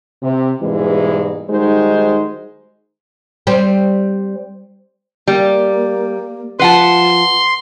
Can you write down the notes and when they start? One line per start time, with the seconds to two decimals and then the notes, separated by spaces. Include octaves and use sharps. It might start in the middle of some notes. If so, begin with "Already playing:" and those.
0.22 C3
0.62 G#2 B2 E3 G3 G#3 A#3
1.51 D#3 G3 G#3 D#4 F#4 C5
3.47 G3 C4
5.27 G3 A#3
6.59 F3 B4 F#5 A5 C6